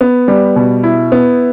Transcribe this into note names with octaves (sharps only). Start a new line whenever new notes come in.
B3
G3
B2
E4
B3